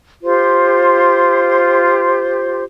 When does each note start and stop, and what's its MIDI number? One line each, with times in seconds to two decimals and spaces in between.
0.23 2.64 65
0.23 2.64 67
0.23 2.64 72